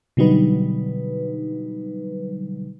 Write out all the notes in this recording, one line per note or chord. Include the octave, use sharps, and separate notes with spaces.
B2 D3 F#3 G3 D#4 B4